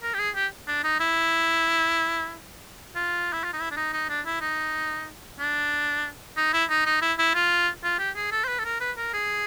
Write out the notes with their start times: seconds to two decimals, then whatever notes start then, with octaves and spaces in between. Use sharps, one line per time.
0.03 A#4
0.14 G4
0.19 G#4
0.35 G4
0.68 D4
0.84 D#4
1.00 E4
2.96 F4
3.33 E4
3.44 F4
3.53 D#4
3.60 E4
3.71 D4
3.77 D#4
3.93 D#4
4.09 D4
4.25 E4
4.41 D#4
5.39 D4
6.37 D#4
6.53 E4
6.69 D#4
6.86 D#4
7.02 E4
7.19 E4
7.34 F4
7.83 F4
7.99 G4
8.16 G#4
8.32 A4
8.44 C5
8.48 B4
8.59 A4
8.65 A#4
8.80 B4
8.97 A#4
9.13 G#4